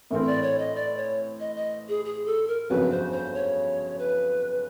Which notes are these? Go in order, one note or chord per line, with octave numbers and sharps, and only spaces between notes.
A2 E3 A3 C4 A#4
D5
C#5
D#5
D5
C#5
D#5
D#5
G#4
G#4
A4
A#4
G1 F2 C#3 F#3 B4
C5
C5
C#5
B4